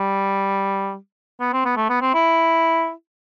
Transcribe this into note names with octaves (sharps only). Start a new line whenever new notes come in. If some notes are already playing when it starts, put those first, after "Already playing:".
Already playing: G3
B3
C4
B3
A3
B3
C4
E4